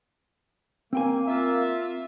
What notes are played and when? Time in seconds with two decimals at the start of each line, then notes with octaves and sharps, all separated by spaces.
0.93 A#3 C4 G5 G#5
1.27 F4 E5